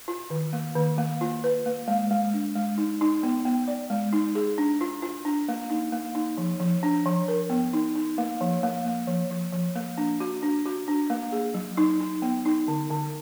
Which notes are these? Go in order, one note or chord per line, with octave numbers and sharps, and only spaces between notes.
F4
D#3
A#3
D#3
A#3
F4
B4
A#3
G#3
G#3
D4
G#3
D#4
D#4
B3
B3
D5
G#3
D#4
G#4
D4
F4
F4
D4
A#3
D#4
A#3
D#4
F3
F3
D4
F3
A#4
B3
D#4
D#4
A#3
F3
A#3
A#3
F3
F3
F3
A#3
D4
F#4
D4
F#4
D4
A#3
G#4
F#3
D#4
D#4
B3
D#4
D3
D3